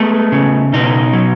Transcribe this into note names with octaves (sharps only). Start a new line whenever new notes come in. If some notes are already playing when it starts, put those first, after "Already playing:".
Already playing: G#3 A3 B3
C#3
B2 D#4
F#3